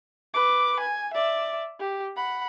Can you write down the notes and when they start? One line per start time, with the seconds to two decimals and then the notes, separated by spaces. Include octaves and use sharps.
0.34 B4 D6
0.80 G#5
1.14 D5 E5
1.80 G4
2.16 F#5 B5